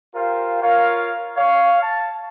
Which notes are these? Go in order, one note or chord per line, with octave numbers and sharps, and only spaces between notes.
F4 G4 A#4 C5 F5
F4 A#4 C#5 F5
C#5 F5
A5